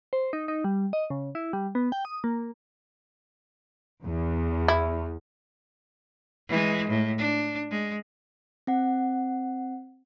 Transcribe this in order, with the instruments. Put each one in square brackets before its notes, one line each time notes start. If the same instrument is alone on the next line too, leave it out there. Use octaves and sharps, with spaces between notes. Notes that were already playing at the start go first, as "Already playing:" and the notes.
[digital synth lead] C5
D#4
D#4
G3
D#5
C#3
E4
G3
B3
G5
D#6
A#3
[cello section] E2
[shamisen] E4
[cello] E3 G#3
A2
D4
G#3
[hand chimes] C4 F#5